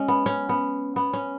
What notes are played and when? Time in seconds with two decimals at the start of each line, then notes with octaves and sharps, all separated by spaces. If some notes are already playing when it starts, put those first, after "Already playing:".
Already playing: G#3 C#4
0.08 B3
0.26 C#4
0.49 B3
0.96 B3
1.13 C#4